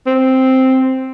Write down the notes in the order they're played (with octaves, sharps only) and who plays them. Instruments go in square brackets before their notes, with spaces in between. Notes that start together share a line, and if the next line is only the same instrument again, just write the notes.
[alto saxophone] C4